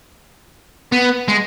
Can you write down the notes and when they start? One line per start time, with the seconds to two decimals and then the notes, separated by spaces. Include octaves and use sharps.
0.92 B3
1.28 G#3